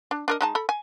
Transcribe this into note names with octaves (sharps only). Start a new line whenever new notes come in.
D4
D4 A#4 D#5
G#3 D#4 A5
A4 B5
G#5